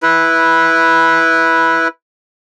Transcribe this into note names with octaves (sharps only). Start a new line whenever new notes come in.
E4 B4